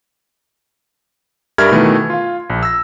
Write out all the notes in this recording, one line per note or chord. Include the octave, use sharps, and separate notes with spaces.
G2 G3 A#4 E5 F6 G#6
B2 D#3 E3 A3
F4 F5
A#1
E6 A#6